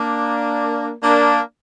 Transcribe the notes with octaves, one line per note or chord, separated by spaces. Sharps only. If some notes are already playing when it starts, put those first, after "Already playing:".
Already playing: A#3 D4
A#3 D4